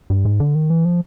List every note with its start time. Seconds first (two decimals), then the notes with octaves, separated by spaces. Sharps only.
0.10 G2
0.25 G#2
0.40 D3
0.55 D#3
0.70 E3
0.85 F3